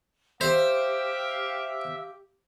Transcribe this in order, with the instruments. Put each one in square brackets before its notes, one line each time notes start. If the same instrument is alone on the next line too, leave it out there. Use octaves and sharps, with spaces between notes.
[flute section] G4 [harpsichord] C5 [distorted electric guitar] E5 [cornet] F5